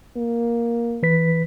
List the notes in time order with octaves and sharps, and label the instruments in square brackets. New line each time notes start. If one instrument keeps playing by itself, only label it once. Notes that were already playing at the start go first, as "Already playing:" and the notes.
[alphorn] A#3
[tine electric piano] E3 B4 B6